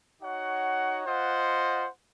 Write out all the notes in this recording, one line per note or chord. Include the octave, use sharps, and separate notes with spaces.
D#4 F#4 C#5 F#5
F4 C5 D#5 F#5